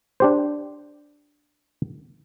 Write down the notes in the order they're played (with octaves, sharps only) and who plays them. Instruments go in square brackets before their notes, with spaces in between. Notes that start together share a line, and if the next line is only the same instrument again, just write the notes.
[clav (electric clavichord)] D4 G4 C5